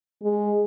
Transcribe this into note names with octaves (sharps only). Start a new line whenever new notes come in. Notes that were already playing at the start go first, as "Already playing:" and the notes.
G#3